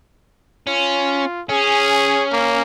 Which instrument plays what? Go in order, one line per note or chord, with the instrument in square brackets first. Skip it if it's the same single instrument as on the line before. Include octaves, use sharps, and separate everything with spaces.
[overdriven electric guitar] C#4 [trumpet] F4
[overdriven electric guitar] C#4 [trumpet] G#4
[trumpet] A#3